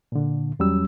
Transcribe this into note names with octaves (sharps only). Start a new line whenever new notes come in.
A#2 D3
E2 F#3 G3 C#4 E6